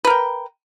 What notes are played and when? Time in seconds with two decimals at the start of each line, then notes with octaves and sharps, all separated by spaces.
0.05 B4
0.07 A#4
0.10 G5